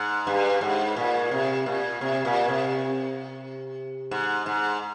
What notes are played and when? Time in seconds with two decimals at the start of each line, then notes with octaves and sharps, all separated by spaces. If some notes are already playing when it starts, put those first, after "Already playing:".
Already playing: G#2
0.27 G2
0.61 G#2
0.96 A#2
1.31 C3
1.66 A#2
2.01 C3
2.25 A#2
2.48 C3
4.11 G#2
4.46 G#2